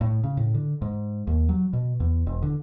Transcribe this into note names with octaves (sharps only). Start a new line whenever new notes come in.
A2
C#3
A2
D3
G#2
D#2
F#3
B2
E2
E1
D3